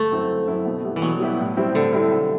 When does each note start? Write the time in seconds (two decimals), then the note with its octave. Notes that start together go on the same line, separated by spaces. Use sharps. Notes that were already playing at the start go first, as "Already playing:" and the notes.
Already playing: G1 A3
0.12 F#2 F#3 C4 E4
0.30 G1
0.48 F#2 F#3 C4 E4
0.66 B2
0.84 G3 B3 E4 G4
0.96 E3
1.02 B2 F#3
1.20 G3 B3 E4 G4
1.39 A2
1.57 G3 C4 E4
1.75 A2 D3
1.93 G3 C4 E4
2.11 B1